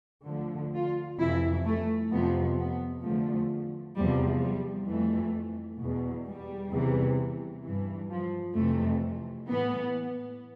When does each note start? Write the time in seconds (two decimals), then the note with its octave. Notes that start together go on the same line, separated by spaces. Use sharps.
0.28 D2 D3 F3
0.75 F4
1.20 F2 C3 E3 E4
1.66 A3
2.12 F2 C3 F3 B3
2.59 B3
3.04 E2 D3 F3 A3
3.96 E2 C3 F3 G3
4.42 G3
4.88 F2 E3 A3
5.80 E2 B2
6.26 G3
6.72 E2 C3 E3
7.64 G2 E3
8.10 F3
8.56 F2 C3 E3 A3
9.48 A2 E3 B3